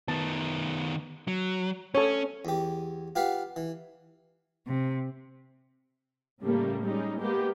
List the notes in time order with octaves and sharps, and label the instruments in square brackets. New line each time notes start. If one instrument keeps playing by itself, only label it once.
[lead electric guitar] D#3 B3 [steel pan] A5
[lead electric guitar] F#3
[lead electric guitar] C#4 [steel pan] A4 C#5
[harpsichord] E2 G4
F4 G4 B4 F5 F#5
E3
[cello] C3
[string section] A2 C#3 G3 A3 A#3
G3 G#3 C#4 D#4
G#3 A#3 B3 G4